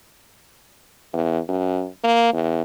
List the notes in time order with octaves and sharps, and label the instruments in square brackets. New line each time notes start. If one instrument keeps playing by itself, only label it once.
[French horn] E2
F#2
A#3
E2